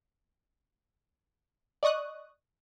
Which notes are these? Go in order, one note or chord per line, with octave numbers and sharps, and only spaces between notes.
D5 D#5 C#6 D#6 F#6